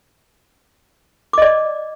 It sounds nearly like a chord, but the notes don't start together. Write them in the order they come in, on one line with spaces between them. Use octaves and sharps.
D6 D#5 D5